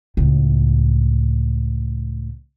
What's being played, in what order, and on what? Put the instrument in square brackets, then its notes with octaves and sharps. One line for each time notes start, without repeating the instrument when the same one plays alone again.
[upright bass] C#2 A2